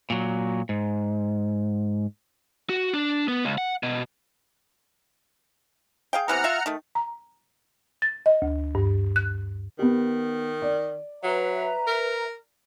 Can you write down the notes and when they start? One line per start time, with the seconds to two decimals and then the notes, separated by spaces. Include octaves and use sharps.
0.10 A#2 F#3
0.69 G#2
2.69 F#4
2.94 D4
3.28 B3
3.45 C#2
3.58 F#5
3.83 B2
6.13 G#4 F5 G5
6.28 C3 E3 B3 F#5 A#5 F6
6.44 F4 E5
6.66 D#3 A3
6.95 A#5
8.02 A6
8.26 D#5
8.42 D2
8.75 G2
9.16 F#6
9.79 D#3 B3 G4
10.62 D5
11.23 F#3 B4 E5 A#5
11.87 A#4